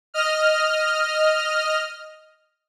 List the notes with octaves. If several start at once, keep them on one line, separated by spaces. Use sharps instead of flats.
D#5 F6